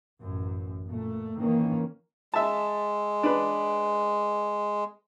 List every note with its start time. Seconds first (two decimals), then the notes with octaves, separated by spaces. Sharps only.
0.20 A1 F#2
0.87 A#2 A3
1.37 D#3 E3 A#3 C#4
2.34 G#3 E5 A5
3.23 D4 B4